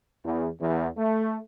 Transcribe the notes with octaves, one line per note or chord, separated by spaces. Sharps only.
E2
E2
A3